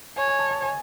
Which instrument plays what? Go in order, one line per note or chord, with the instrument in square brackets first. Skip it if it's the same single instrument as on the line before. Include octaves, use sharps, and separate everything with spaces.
[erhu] C#5 [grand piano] G#5
[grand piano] G#5
A5
A5
G#5